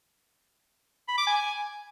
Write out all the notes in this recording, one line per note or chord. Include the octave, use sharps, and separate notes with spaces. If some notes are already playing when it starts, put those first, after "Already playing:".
B5
D6
G#5